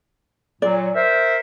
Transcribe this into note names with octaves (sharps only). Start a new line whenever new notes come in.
A#2 F#3 D5
A#4 C5 E5